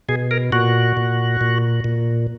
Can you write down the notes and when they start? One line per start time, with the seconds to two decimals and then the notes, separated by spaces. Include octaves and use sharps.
0.09 B2 G#4
0.31 A#4
0.52 A#2 F#4
0.97 A#2
1.41 A#2
1.84 A#2